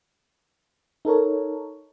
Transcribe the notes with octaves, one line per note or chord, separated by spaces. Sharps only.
D#4 A4 A#4 C#5